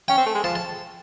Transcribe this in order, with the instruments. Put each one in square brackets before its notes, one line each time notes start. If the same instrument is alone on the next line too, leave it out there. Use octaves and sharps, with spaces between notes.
[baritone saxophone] C#4 [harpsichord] G5
[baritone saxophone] C4
A3
G#3
[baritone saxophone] F3 [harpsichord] A5
[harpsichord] A5